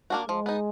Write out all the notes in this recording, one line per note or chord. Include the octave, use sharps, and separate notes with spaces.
A#3 D4 F#4
F3 G#3
B3 D#4